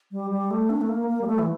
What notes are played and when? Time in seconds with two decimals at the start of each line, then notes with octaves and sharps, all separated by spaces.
0.12 G3
0.31 G3
0.51 A3
0.70 D4
0.81 A3
0.89 A#3
1.08 A#3
1.21 G3
1.27 A3
1.39 E3